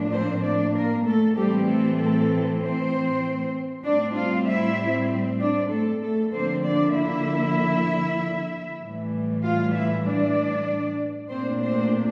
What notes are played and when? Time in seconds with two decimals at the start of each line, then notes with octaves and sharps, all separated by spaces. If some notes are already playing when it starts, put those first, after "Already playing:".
Already playing: A2 F3 A#3 D4
0.12 C4 C5
0.44 D4 D5
0.74 A#3 A#4
1.06 A3 A4
1.36 A2 E3 G3 A3 C4 G4
1.67 A3 A4
1.98 A3 A4
2.61 C4 C5
3.84 A2 G3 C4 D4 D5
4.16 F4 F5
4.47 E4 E5
5.40 D4 D5
5.71 A3 A4
6.03 A3 A4
6.33 D3 F3 A#3 C4 D4 C5
6.64 D4 D5
6.95 E4 E5
8.82 A2 E3 G3
9.43 F4 F5
9.74 E4 E5
10.05 D4 D5
11.30 A#2 A3 C4 D4 C5
11.61 C4 C5